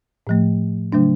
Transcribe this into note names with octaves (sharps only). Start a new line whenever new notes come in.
A2 F3 A3
C#3 F#3 A3 D4